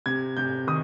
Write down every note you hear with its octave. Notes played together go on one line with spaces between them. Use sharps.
C3 G#6
C3 G6
D#3 D#6